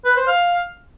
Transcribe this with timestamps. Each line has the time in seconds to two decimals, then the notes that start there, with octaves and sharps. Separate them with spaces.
0.05 B4
0.16 C5
0.27 F5